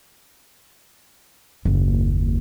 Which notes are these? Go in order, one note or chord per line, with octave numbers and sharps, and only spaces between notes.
F#1 D#2